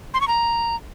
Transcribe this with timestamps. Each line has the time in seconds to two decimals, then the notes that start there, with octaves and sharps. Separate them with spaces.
0.14 C6
0.21 C#6
0.28 A#5